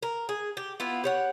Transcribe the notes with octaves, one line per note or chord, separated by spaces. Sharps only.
A#4
G#4
G4
B3 E4 F4
G4 C#5 F#5